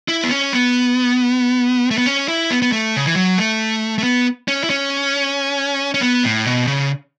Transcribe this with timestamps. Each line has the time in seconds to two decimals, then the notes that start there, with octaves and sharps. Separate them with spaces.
0.08 E4
0.24 B3
0.31 C#4
0.53 B3
1.91 A3
1.98 B3
2.06 C#4
2.28 E4
2.51 B3
2.62 B3
2.72 A3
2.96 C#3
3.06 E3
3.16 F#3
3.38 A3
3.98 A3
4.03 B3
4.48 C#4
4.64 E4
4.70 C#4
5.94 C#4
6.01 B3
6.23 A2
6.45 B2
6.67 C#3